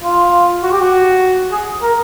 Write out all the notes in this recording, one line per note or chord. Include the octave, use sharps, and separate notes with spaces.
F4
F#4
G4
F#4
G#4
A#4